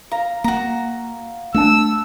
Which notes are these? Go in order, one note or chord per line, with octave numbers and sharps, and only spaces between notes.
F5 A#5
A#3 F#4 A#5
A3 D4 F#5 A5 E6